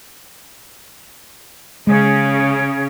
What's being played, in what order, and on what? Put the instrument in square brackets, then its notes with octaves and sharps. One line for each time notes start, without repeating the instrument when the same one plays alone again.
[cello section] C#3 C#4 [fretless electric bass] G#3 [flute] G#4